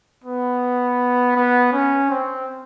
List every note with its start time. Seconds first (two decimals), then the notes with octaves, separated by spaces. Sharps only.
0.24 B3
1.36 B3
1.73 C#4
2.10 C4